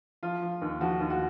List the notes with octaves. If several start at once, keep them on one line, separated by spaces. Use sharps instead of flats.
F3 F4
F3
D#2
F3 F#4
D#2
F#4